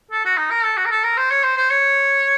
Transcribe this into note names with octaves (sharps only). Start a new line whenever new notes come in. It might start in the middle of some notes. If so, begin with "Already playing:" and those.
A4
F#4
D#4
A#4
A4
F#4
A#4
A4
A#4
C5
C#5
C5
C5
C#5